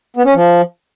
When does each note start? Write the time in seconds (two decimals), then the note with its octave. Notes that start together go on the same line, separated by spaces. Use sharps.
0.17 B3
0.25 C#4
0.34 F3